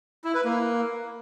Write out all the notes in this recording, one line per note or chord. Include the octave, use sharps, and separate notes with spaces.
E4
B4
A#3